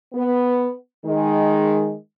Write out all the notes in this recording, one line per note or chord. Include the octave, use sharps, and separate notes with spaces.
B3
D#3 G#3